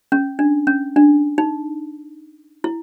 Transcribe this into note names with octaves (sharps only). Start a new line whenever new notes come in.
C#4
D4
C#4
D4
D#4
E4